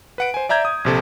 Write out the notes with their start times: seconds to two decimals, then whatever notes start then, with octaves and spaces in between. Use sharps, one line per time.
0.18 B4 F#5 D7
0.34 C5 G#5
0.49 D5 E5 A#5 G6 G#6
0.65 D#6
0.85 A#1 C3 A4